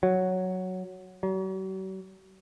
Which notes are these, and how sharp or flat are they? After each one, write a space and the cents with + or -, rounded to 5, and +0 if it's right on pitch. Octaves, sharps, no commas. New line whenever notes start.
F#3 +0
F#3 +45